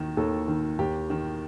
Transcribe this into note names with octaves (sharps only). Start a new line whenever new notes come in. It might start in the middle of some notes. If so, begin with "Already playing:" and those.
Already playing: D#2 D#3
D#2 A4
D#3
D#2 G4
D#3